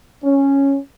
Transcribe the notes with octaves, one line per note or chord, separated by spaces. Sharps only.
C#4